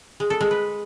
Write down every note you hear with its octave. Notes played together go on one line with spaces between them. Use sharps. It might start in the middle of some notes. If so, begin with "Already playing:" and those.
G#3
A4
G#3
B4